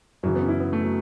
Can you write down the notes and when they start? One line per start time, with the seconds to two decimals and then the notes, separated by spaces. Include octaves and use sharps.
0.23 F#2 C#3 E3 F#3
0.35 B3
0.42 C#4
0.48 E4
0.60 B3
0.73 A3
0.84 F#3